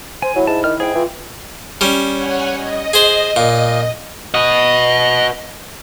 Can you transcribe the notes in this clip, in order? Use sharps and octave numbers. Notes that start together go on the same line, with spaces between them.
C5 G#5
F#3 E4
G#2 A5
D#3 F6
G#2 G#4 G5
E3 F4
G3 C#4
C#5 F#5 G#5
D#5
G#4 C5
A#2
F#4 B4 D#5